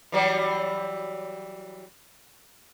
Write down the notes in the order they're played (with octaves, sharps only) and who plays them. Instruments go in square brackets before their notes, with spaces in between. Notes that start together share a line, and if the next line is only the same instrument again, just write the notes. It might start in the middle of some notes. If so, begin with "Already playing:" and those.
[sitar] E3 F#3 G3